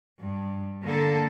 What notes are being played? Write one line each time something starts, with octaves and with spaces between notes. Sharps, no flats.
G2
D3 A#3 A4